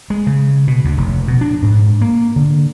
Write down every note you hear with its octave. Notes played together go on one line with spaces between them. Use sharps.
G#3
C#3
B2
D2
F1
B2
D4
G#2
A#3
D3